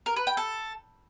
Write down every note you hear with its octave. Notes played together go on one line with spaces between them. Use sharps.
A#4
B4
G5
A4